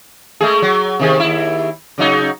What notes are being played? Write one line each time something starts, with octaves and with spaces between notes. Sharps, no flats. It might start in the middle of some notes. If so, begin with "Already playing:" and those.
G#3 A3 G#4
F#3
C3 D#3 G#4
D#2 E4
C#3 F#3 D#4